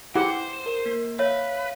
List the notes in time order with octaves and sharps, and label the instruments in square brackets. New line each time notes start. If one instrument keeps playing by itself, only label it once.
[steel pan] E4 G4 F#5 [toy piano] G#4 [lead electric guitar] C5
[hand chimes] A#4
A#3
[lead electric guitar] B4 [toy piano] C#5 [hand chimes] E5 F5